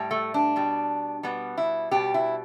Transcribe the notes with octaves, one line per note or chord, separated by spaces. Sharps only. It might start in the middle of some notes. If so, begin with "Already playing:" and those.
Already playing: A2 G3
A3
D4
B2 G3
B2 G3 B3
E4
B2 G3 G4
E4